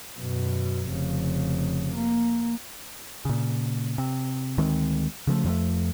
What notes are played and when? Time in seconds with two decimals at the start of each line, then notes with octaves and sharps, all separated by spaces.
0.19 F#2 B2
0.91 F1 C#3
1.95 A#3
3.25 A#2 C#3
3.98 C3
4.58 D2 D#3 G#3 C4
5.27 C#3 F3 G#3 A3
5.44 F2 F3 G3 A3